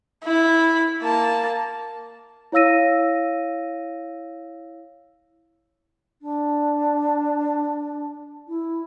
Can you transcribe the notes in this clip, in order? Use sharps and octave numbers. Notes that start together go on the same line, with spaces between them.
E4 B5
A#3 A5
E4 C#5 F5 E6 A#6 D#7
D4
E4